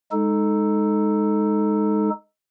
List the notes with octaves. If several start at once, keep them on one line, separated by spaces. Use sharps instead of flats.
G#3 D#4 A4